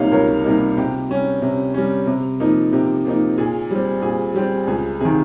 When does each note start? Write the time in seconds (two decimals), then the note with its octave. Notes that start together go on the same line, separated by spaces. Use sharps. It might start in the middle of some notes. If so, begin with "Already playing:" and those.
Already playing: C#2 C3 G3 A#3 D#4 C#5 D#5 F5
0.12 C#2 A#4 C#5
0.44 C3 G3 A#3 D#4
0.77 C3 G4
1.09 G3 C#4
1.42 C3
1.74 G3 C#4
2.07 C3
2.40 F3 A#3 D#4
2.72 C3 G4
3.05 F3 A#3 D#4
3.38 A#2 G#4
3.71 G3 C4
4.02 A#2 G#4
4.35 G3 C4 G4
4.67 C#2 G#4
5.00 C3 D#3 G#4